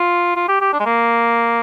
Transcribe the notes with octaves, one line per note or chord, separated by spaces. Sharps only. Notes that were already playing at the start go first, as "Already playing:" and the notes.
Already playing: F4
F4
G4
G4
D4
G#3
A#3